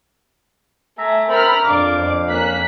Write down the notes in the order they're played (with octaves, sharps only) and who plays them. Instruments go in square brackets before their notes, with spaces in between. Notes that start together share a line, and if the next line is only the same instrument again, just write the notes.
[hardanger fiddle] A3 G#5 [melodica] E5 A#5
[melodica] C4 A4 [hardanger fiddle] A#4 [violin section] A#5 B5 F6
[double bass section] F2 [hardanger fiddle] D4 [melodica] F5 [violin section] D6
[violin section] A#3 F#6 B6 [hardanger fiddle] C#4